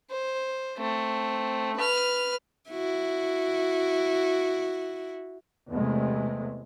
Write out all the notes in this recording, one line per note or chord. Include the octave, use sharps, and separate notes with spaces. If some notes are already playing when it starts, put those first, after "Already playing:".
C5
A3 C4
B4 F6
E4 F#4
E2 C3 G#3 A3